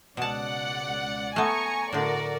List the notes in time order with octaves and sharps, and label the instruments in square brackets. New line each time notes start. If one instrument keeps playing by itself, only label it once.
[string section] C#2 D5 F#5 [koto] B2 A5
[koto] A3 B3 [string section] G#5 A#5 C#6
[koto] A2 D3 [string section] F#4 A#4 D5